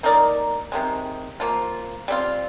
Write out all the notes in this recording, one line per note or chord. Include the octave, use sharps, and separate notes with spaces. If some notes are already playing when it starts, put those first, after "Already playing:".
A#3 D#4 A#4 D5
C3 D#3 G#3
F3 A#3 F4
G3 C4 F4